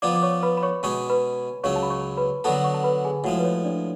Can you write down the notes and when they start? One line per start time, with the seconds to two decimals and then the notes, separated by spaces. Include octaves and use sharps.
0.02 F3 B3 F4 D5 D6
0.16 D6
0.23 C#5 C#6
0.43 B4 B5
0.57 B5
0.63 C#5 C#6
0.83 B2 G#3 C#4 G#4 C#5 C#6
1.10 B4 B5
1.64 C#2 C#3 F#3 C#4 C#5 C#6
1.76 A5
1.83 B5
1.90 C#5 C#6
2.17 B4 B5
2.44 D3 F#3 B3 F#4 A4 A5
2.64 C#5 C#6
2.74 A5
2.84 B4 B5
3.05 G#4 G#5
3.24 A2 F3 G#3 F#4 F#5
3.39 B4
3.45 C#5
3.65 D4 D5